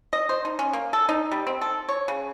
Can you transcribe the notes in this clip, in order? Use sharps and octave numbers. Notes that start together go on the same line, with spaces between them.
D#5
C5
D#4
C#4
A#3
A4
D#4
G3
C4
A4
C#5
C#3